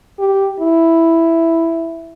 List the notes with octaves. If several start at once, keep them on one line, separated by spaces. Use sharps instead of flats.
G4
E4